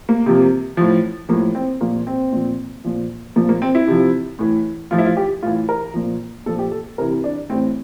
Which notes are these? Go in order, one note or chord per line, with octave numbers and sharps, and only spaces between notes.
A#3
C3 F3
A2 F3
A2 F3 A#3
C4
A#2 F3 A#3
C4
A#2 F3
A#2 F3
A#2 F3 A#3
A#3
C4
E4
C3 F3
A2 E3
A2 F3 F4
E4
F4
G4
A2 E3 F4
A#4
A#2 F3
A#2 F3 A4
G4
A4
C3 E3 A#4
D4
A2 E3 C4